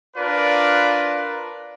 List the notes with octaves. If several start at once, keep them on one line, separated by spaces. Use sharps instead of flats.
D4 F4 A#4 B4 D5